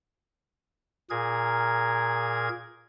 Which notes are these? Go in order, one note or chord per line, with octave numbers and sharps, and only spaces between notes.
A#2 G#4 A#4 G#6